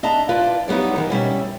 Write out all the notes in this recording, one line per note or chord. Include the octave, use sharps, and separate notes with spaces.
D4 D#5 E5 A5 A#5
E4 F4 B4 D5
F#3 G3 B3 D#4 E4
D#3 E3 D#5
B2 G3 C#4 E5